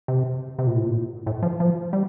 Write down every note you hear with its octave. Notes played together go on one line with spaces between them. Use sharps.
C3
C3
A#2
A2
A#2
A2
F3
F3
G3